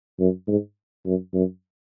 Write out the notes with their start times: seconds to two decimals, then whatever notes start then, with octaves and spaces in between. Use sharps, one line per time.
0.20 F#2
0.48 G#2
1.06 F#2
1.34 F#2